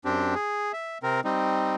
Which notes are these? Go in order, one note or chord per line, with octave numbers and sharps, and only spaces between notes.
F#2 C4 D4 G4
G#4
E5
C3 C4 A#4
G3 C4 D#4